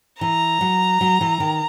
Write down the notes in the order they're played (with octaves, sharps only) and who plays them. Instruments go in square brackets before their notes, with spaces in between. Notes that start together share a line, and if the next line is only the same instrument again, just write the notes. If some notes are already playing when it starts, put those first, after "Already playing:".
[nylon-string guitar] E3 [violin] A#5
[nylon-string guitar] F#3
F#3
E3
D#3